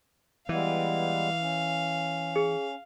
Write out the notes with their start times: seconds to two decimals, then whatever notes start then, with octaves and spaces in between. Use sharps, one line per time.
0.49 E3 G3 G#3 B3 F5
1.41 C#4
2.36 G#4